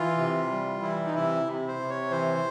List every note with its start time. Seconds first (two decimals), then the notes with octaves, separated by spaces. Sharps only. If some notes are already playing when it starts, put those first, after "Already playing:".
Already playing: E3 F4
0.18 C3
0.51 G3
0.82 E3 E4
1.05 D#4
1.15 C3 E4
1.46 C3
1.68 C5
1.79 C3
1.89 C#5
2.11 E3 C5